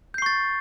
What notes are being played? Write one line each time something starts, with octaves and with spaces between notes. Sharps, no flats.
C#6 G6 A6 C7